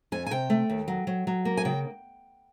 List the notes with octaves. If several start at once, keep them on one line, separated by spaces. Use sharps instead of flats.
F2 G#5
G#5
C3 G5
A3
D#2
F#3
F#3
F#3
A#3
G#5
C#3 G5